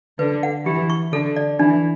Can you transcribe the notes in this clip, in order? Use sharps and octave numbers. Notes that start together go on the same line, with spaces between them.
D3 B4
F#5
E3 G4
C#6
D3 A4
D5
E3 D4